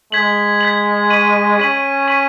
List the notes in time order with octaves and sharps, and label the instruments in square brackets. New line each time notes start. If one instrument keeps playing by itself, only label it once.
[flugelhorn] G#3 [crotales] G#6 B6 F#7
[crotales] G#6 B6 F#7
C#6 B6 D#7 F#7
[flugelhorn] C#4 [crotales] C#6 B6 D#7 F#7
[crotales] C#6 B6 D#7 F#7